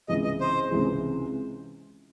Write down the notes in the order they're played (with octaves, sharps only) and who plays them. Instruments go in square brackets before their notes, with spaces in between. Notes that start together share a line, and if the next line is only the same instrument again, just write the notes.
[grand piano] C#2 C3 E3 G#3 [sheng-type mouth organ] D#5
[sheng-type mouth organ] D#5
C5
[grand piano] C#2 C3 E3 G#3